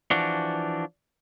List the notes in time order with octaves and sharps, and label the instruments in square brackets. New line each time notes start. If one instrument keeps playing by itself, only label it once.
[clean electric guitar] E3 F3 D4 F#4